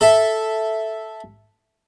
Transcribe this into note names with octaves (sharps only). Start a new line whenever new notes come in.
A4 E5